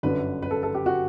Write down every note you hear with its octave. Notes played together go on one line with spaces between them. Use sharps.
G1 F#2 D3 B4
B4
A4
A4
G4
F#4